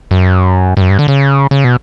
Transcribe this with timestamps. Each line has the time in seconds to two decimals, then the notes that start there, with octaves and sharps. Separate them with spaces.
0.11 F#2
0.77 G2
0.81 F#2
0.90 G2
0.99 D3
1.08 C#3
1.51 C#3
1.64 B2